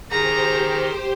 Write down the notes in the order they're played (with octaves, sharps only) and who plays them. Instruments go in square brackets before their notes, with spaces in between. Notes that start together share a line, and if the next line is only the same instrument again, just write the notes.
[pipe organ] D#3 D#4 [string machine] G4 C5 [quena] G#4 [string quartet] A#5